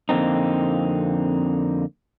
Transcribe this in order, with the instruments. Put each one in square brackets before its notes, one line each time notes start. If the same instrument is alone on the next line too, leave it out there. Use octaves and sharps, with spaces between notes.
[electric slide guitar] F2 D3 A#3 C4 D#4